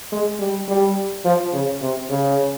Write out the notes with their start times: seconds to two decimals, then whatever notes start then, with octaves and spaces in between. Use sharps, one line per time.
0.12 G#3
0.40 G3
0.68 G3
1.25 F3
1.53 C#3
1.81 C3
2.09 C#3